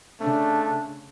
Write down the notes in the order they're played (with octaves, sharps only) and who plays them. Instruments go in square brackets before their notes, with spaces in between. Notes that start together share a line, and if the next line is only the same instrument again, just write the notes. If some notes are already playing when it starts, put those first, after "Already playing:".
[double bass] C#3 [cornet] A3 [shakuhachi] D4